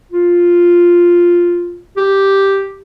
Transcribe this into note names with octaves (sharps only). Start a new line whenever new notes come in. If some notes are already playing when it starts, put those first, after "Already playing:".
F4
G4